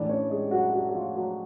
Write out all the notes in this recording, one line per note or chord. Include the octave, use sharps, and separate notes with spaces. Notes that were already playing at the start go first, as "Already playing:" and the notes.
Already playing: A2 E3 D4 D5
C#4 C#5
G#3 G#4
F#3 F#4
F#3 F#4
F#4
F3 F4
F#3 F#4